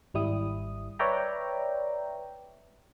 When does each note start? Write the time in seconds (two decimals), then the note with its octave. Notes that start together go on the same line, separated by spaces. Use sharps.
0.14 G#1 G3 E4 D#6
0.99 B4 C#5 D5 E5 G5 A#5